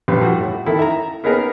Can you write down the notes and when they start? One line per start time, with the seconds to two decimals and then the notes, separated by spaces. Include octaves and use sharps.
0.08 A#1 G3 B4
0.21 F3 G3 F#4
0.40 A2
0.66 D#3 E4 A4
0.79 E5 A#5
1.24 A#3 B3 D#4 G#4 A#4 B4